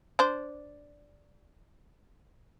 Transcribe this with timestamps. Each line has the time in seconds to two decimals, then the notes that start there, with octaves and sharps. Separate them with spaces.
0.19 D4 C5